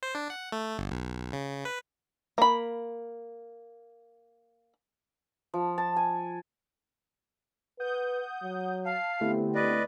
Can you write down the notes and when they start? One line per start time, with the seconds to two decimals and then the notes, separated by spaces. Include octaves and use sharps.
0.03 C5
0.15 D4
0.30 F#5
0.52 A3
0.79 G1
0.91 B1
1.33 C#3
1.65 B4
2.38 A#3 B5
5.54 F3
5.78 A5
5.96 G#5
7.80 B4 F#5 D#6 G6
8.43 F#3
8.86 F5 A5 C7
9.21 D3 A3 B3 C4 E4 G4
9.55 B4 D5 D#5